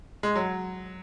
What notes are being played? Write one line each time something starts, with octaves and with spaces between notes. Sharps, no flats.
G#3
F#3